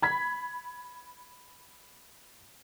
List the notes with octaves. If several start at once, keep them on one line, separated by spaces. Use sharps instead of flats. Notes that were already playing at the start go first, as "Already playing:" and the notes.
B5 G#6 B6